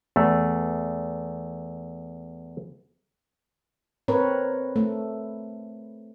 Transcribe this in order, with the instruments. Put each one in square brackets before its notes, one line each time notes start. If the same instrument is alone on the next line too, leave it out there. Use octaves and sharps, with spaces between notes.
[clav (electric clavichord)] E2 A3
[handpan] C4 A#4 B4 C#5
A3